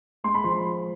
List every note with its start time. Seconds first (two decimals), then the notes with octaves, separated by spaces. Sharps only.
0.24 G#3 C6
0.34 B5
0.44 F3 C6